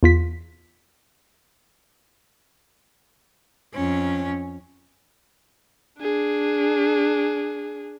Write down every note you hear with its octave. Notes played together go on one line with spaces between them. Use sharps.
E2 F4 B6
F2 C#4
D4 G#4